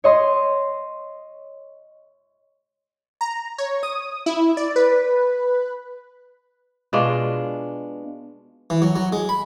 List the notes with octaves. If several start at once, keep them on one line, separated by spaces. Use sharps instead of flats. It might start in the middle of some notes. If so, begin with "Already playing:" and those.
C#5 D#5 C6
A#5
C#5
D#6
E4
D5
B4
B2 G#3 D4 F4
E3
F#3
F#3
G#3
B5